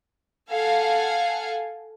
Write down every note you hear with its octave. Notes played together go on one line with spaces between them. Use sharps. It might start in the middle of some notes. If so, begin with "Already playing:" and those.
A4 F5 F#5 G#5